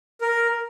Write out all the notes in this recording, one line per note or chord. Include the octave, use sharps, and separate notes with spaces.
A#4